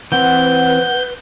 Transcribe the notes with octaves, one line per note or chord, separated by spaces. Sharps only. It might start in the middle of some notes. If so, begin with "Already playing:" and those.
E3 C4 B4 F#5 G6